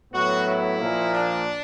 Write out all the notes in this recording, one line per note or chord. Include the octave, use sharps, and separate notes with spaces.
A2 F#3 B3 F#4
E4
A#2 F3 A#3
D4